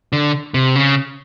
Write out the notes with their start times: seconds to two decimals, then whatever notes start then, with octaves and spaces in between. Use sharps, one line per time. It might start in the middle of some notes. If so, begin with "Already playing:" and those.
0.13 D3
0.54 C3
0.75 C#3